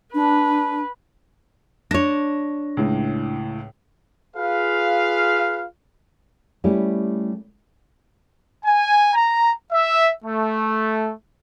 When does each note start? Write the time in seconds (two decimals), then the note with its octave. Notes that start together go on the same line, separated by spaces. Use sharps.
0.14 D4 B4
1.91 D4 C#5 A#6
2.77 C#2 A2
4.36 F4 G#4 B4 F5
6.64 G3 A3 C#4 E4 G4
8.65 G#5
9.14 A#5
9.73 E5
10.25 A3